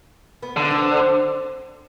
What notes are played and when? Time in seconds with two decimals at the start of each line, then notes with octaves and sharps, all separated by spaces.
0.42 B3
0.57 D3
0.70 C4